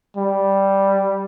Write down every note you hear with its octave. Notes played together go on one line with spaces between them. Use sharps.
G3